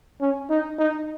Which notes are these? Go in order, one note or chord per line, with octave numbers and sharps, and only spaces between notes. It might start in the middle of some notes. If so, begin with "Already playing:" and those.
C#4
D#4
D#4